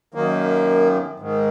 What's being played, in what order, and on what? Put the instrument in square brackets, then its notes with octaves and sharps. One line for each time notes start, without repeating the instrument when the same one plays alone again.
[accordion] F#2 D#3 A#3
G#2 D#3